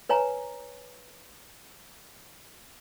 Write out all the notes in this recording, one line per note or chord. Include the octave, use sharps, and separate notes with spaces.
B4 C#5 G#5 A#5